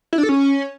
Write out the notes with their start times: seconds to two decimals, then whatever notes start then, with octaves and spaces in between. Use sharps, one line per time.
0.13 E4
0.18 D4
0.23 A4
0.29 C#4